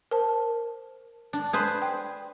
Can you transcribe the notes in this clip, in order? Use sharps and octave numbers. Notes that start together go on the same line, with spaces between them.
A#4 C5 A5
D4
G#4 B4 C5
G5